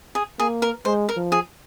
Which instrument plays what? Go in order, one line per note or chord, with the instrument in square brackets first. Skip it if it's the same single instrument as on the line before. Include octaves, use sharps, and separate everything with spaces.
[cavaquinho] G#4
[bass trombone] A#3 [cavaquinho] G#4
[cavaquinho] A#4
[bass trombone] G#3 [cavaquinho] C5
[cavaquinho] A#4
[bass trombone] F3
[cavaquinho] G#4